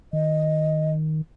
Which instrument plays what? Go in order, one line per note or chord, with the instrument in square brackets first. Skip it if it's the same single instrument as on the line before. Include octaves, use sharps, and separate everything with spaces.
[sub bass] D#3 [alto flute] D#5